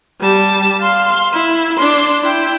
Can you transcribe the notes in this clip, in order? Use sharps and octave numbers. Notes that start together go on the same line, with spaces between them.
G3 A5
F5 C6
E4
D4 C6
E4 G5